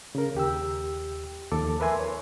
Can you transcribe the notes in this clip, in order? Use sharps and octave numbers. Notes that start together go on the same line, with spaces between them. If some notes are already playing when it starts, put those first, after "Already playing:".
C#3 A#4
D#2 G4 G5 E6
D#2 F3 A4 D6
A#4 B4 E5 G#5 C6
C#5